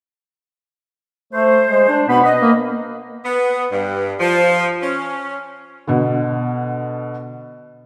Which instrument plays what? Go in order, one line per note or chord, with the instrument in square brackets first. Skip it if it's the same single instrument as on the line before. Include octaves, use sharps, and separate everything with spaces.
[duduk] A3 [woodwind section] C5
[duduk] G#3
D4
[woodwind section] B2 D4 B5 [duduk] B3
[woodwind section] B4 D#5
[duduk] A#3
[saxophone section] B3
G2
F3
C#4
[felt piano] B2 D3